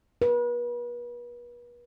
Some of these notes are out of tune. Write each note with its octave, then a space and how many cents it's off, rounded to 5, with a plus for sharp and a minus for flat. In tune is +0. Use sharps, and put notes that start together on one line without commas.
B4 -40